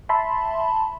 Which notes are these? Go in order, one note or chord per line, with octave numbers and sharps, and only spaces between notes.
E5 A5 B5 C6